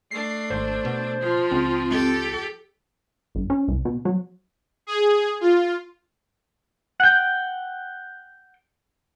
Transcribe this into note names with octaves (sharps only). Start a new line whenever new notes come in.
A3 D4 C7
G#1 C5
B2
F3 F4
C#2 C4
G4 A4
G1
C#4
C2
B2
F#3
G#4
F4
F#5 G5